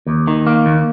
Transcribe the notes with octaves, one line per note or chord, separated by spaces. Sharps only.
D#2
D#3
A#3
D#2